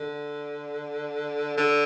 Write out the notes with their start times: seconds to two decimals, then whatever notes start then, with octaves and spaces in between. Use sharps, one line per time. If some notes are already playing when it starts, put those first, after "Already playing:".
Already playing: D3
1.57 D3